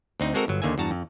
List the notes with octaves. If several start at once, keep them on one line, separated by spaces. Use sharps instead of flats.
D2 C4 D#4
G#3 C4 F#4 A4 A#4
G1 F#3
D#2 D3 A#3 E5 G#5
E2 G2 F#4 A5 A#5
F2